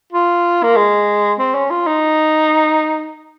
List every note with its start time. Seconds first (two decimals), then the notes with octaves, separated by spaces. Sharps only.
0.13 F4
0.63 A#3
0.76 G#3
1.39 C4
1.55 C#4
1.70 F4
1.87 D#4